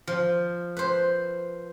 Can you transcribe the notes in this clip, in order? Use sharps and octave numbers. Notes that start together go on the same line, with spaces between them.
F3
B4 C5